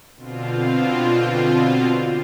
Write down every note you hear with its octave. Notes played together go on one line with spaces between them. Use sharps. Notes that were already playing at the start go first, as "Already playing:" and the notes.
B2 D3 C4 F4